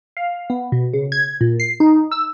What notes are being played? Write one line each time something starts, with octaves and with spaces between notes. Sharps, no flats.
F5
B3
B2
C#3
G#6
A#2
C7
D#4
E6